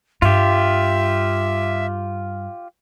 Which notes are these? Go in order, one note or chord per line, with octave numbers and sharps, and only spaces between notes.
G2 F4 G4 E5